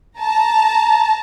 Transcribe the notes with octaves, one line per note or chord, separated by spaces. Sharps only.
A5 A#5